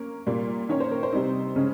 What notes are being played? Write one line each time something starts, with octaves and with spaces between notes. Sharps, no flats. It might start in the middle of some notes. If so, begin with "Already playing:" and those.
Already playing: A#3 C#4 A#4
A#2 G3 A#3
D#3 A#3 C#4 C#5
C5
A#4
C5
C3 G3 C4 D#4
C#3 G#3 C#4